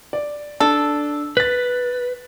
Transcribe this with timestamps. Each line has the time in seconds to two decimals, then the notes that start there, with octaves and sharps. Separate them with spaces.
0.13 D5
0.60 D4 A4
1.37 B4 A6 B6